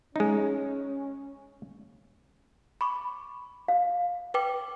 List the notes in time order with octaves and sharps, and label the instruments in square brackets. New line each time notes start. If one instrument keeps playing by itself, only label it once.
[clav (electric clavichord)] G#3 D#4 [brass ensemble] C#4
[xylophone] B5 C#6 D6
[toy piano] F5
[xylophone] B4 G5 D6